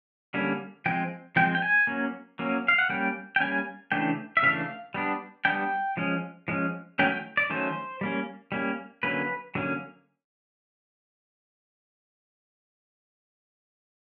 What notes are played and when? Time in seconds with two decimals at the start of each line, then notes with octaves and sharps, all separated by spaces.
0.34 D3 G3 A#3 C#4
0.86 F3 G#3 C4 G5
1.36 F3 G#3 C4 G5
1.55 G5
1.62 G#5
1.87 F#3 A#3 C#4
2.39 F#3 A#3 C#4
2.68 F5
2.78 F#5
2.90 G3 A#3 C#4 G5
3.36 G5
3.40 G3 A#3 C#4 G#5
3.92 C#3 E3 A3 D4 G5
4.37 E5
4.43 C#3 E3 A3 D4 F5
4.94 G3 B3 D4
5.45 G3 B3 D4 G5
5.97 F3 G#3 C#4
6.48 F3 G#3 C#4
6.99 D#3 F#3 A3 C#4 G5
7.12 G5
7.37 D5
7.50 D#3 F#3 A3 C#4 C5
8.01 G3 A#3 C#4
8.52 G3 A#3 C#4
9.03 D3 F#3 A#3 C#4 B4
9.55 D3 F#3 A#3 C#4